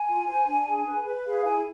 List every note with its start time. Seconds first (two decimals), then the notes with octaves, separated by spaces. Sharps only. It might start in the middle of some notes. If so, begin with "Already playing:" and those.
Already playing: G#5
0.08 F4
0.27 C5
0.47 D4
0.67 G#4
0.86 B4
1.06 B4
1.25 G#4 F5
1.45 E4 G#5